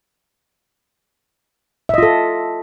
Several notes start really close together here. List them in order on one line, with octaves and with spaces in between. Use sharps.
E5 D#5 F4 A4